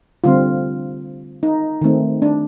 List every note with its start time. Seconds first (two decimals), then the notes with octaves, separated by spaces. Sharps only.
0.24 D3 G3 C4 F4
1.43 D#4
1.81 D#3 A3 C4
2.22 D4